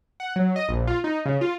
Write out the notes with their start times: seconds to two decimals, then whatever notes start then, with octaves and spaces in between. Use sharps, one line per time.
0.20 F#5
0.36 F#3
0.56 D#5
0.69 A#1
0.87 F4
1.04 D#4
1.26 C#3
1.41 F4